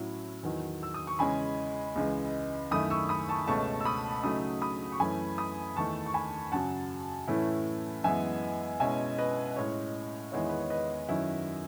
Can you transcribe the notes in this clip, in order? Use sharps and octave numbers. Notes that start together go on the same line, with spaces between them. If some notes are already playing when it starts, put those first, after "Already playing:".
Already playing: A2 F#3 C#4 E4
E2 D#3 F#3
E6
D#6
C#6
E2 C#3 G#3 C#4 G#5 B5
C#2 C#3 E3 G#3
F#2 D#3 A3 E4 B5 D#6
C#6 E6
B5 D#6
A5 C#6
C#2 B2 A3 C#4 A5 C#6
E6
B5 D#6
C#3 F#3 A3 D#4 B5 D#6
B5 D#6
C#6
F#2 E3 A3 C#4 E4 G#5 B5
B5 D#6
E2 D#3 A3 A5 C#6
C#6
G#5 B5
F#2 C#3 F#3 F#5 A5
A2 E3 A3 C#4 E4
F#2 E3 G#3 B3 E5 G#5
B2 G#3 C#4 E4 E5 G#5
B4 D#5
A2 G#3 C#4 C#5
E2 D#3 G#3 B3 E4 C#5
B4
C#5
B4 D#5
F#2 D#3 F#3 C#4 E4